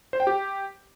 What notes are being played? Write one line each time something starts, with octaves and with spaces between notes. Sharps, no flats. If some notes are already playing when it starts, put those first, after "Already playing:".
C5
G5
G4